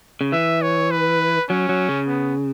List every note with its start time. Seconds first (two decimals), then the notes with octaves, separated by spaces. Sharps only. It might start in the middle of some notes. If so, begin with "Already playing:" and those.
0.21 C#3
0.32 E3 E5
0.62 C#5
0.91 B4
1.50 F#3 C#4
1.69 F#3
1.89 C#3
2.08 B3